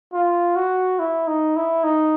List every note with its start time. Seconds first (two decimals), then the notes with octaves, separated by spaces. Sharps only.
0.13 F4
0.56 F#4
0.99 E4
1.27 D#4
1.56 E4
1.84 D#4